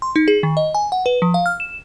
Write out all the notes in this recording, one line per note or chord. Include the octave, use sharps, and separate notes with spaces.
C6
D#4
G#4
D#3
D#5
G#5
F#5
B4
F3
F5
F6
E7